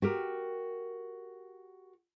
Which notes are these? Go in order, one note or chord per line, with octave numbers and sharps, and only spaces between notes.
F#4 G4 A#4